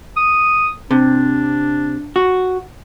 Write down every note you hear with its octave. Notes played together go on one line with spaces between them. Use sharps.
D#6
C3 D4
F#4